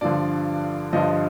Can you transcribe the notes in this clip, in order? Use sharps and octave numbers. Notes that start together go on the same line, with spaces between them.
G2 D3 F3 D5
G2 D3 F3 D#5